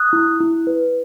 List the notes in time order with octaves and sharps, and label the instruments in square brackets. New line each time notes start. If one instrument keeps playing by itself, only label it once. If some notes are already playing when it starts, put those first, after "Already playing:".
Already playing: [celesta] D#6 F#6
E4
E4
B4